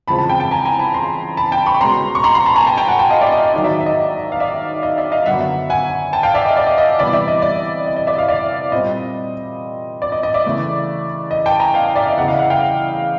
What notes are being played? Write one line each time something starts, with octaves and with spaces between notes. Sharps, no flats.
E2 C#3 F3 G#3 C4 A5 B5
A5 B5
G5 A5
G5 A5
G#5 A#5
G#5 A#5
A5 B5
A#5 C6
A5 B5
G5 A5
B5 C#6
B2 G#3 C#4 A#5 C6
C#6
A#5 C6
A#5 C6
A5 B5
G#5 A#5
G5 A5
G5 A5
F#5 G#5
G5 A5
D#5 F5
D5 E5
D#5
D#5
G#2 D#3 F#3 D#5
D5 E5
E5
D#5
F5
D5 E5
D#5
D5 E5
D#5 F5
F#2 D3 F#3 B3 E5 F#5
F#5 G#5
G5 A5
F5 G5
D5 E5
D#5
D5
D#5
D#5
C3 E3 G3 B3 D5 E5
D5 E5
D#5
D5
D#5
D#5
D5 E5
D#5 F5
D5 E5
A#2 G3 C4 D#5
D5
D#5
D#5
D5 E5
C#3 E3 A3
D#5
G5 A5
G#5 A#5
F5 G5
D5 E5
D#5 F5
E2 C#3 E3 E5 F#5
D#5 F5
E5 F#5
F5 G5